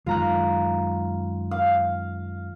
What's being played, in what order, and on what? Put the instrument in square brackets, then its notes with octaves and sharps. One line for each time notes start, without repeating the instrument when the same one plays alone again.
[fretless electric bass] F#2 D#3 G#3 [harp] F4 A#5 F#6
[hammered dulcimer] F5